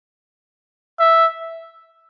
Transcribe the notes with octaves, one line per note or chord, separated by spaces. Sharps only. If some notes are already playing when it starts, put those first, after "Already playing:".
E5